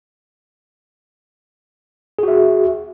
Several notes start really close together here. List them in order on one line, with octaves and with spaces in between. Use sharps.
G#4 F#4 E5